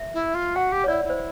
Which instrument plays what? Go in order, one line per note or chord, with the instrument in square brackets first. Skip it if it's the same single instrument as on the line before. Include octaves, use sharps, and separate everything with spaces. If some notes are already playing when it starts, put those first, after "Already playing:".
Already playing: [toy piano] E5
[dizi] E4
F4
[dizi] F#4 [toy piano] F#5
[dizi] G4
[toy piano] C#5
[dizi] E4 [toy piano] D5
[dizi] E4
[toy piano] C5